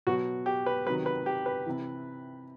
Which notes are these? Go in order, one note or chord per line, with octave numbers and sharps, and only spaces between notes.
B2 F#3 F#4
G4
B4
C3 D#3 F#3 B4
B4
G4
B4
C3 E3